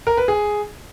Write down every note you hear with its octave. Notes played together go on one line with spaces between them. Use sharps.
A#4
B4
G#4